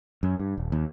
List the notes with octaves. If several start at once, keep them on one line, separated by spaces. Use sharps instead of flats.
F#2
G2
D#1
D#2